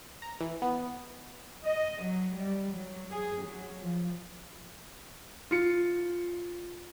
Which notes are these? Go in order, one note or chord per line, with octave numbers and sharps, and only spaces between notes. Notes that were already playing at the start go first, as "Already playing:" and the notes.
A#5
E3
B3
D#5
F#3
G3
F#3
G#4
F#3
F3
F4 C#7